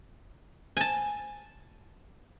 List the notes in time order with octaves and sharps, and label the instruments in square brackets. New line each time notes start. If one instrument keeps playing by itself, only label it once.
[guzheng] G#5 A5